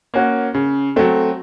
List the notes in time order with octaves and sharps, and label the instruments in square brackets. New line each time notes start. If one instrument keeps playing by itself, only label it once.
[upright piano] A#3 C#4 F#4
C#3
F#3 A3 C4